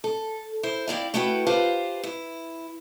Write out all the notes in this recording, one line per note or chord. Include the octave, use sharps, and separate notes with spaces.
A4
E4 C5
C4 E4 D5 F5
A3 E4 F#4 B4 G5
F4 G4 B4 C5 F5 A5
E4